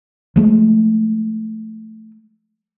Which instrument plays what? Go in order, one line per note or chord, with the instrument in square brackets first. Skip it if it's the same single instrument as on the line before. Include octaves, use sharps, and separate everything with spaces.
[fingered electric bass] F3 G#3 A3